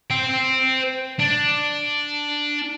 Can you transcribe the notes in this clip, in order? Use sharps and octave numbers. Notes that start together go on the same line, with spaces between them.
C5 G5
D4